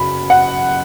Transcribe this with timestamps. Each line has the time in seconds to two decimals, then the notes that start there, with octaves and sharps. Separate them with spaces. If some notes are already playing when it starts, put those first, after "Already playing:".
Already playing: F#2 C#3 F#3 B5
0.30 F#5